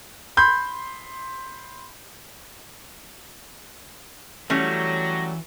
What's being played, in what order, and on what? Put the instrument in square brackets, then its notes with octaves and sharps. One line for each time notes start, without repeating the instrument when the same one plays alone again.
[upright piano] B5 C6 G6
[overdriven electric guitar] E3 [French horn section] F#3 [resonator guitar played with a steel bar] G3 A3 C#4 [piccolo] A#6